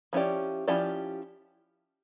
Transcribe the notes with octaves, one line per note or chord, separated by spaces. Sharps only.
F3 C#4 E4 G4 D5
F3 C#4 E4 G4 D5